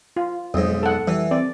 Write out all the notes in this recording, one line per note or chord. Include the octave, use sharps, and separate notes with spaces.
F4
B1 F2 G#2
A4 F#5
E3 G3
C4 D5